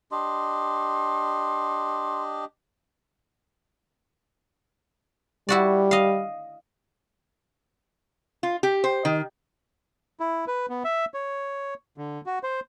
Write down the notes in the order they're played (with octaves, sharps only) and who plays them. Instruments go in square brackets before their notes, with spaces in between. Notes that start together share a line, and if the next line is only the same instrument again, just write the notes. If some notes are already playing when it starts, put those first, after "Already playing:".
[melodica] D4 G4 D#5 [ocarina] C6
[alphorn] G3 [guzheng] E4 F#4 D5
[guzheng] D#5 F5
[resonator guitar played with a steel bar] F4
G4
C5
D#3
[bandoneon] E4
B4
B3
E5
C#5
D3
F#4
C5